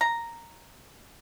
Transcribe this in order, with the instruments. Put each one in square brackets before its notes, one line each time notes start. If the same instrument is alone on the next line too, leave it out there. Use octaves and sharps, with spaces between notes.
[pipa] A#5